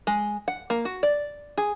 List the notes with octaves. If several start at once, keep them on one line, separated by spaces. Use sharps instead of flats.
G#3
F#5
A#3
F#4
D5
G#4